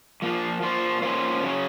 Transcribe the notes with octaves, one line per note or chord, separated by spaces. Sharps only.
F3 A#3 F4
A#3 F4 C5
A#3 C#4 F4 C5
C#3 F#3 C#4